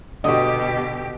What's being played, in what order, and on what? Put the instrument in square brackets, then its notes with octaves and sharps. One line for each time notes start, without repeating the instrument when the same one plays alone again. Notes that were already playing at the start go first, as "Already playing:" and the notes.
[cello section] B2 G4 [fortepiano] D3 F#4 [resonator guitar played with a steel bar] D#5